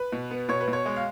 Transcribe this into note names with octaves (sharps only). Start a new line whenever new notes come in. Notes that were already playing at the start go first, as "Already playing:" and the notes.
Already playing: B4
B2
B3
B2 C#5
B4
B2
C#5
G#3
F5